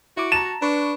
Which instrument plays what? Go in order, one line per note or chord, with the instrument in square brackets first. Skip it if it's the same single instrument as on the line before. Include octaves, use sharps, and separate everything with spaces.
[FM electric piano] E4 D6 [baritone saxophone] F#4
[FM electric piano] A5 A#5 [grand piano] E7
[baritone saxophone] D4 [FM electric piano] B4 C#6